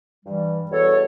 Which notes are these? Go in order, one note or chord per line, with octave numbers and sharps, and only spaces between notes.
G2 E3 G3
E2 B2 G3 A4 C#5